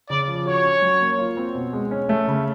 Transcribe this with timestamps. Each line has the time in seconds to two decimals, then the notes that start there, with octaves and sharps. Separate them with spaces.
0.10 C#3 D5
0.28 F3
0.46 F#4 C#5
0.64 C#4
0.82 F#3
1.01 A#3
1.19 F4
1.37 C4
1.55 B2
1.73 G#3
1.91 C#4
2.09 A3
2.28 C#3